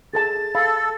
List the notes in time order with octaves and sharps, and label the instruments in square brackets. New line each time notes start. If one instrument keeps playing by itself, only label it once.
[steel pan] G#4 A4 A5 [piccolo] A6
[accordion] A4 [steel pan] F5 B5